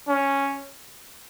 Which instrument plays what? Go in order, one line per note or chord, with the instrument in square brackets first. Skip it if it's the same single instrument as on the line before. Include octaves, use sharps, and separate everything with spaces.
[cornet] C#4